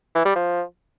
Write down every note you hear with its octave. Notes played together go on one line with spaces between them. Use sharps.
E3
G3
F3